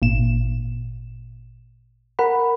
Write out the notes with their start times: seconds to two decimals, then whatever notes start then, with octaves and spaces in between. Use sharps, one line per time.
0.02 G#1 A#2 E7
2.19 A#4 F#5 B5